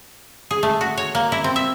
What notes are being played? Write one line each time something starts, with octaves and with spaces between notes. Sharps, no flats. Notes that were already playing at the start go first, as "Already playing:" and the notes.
G#4
A3
F#4
C#5
A#3
E4
C4
E5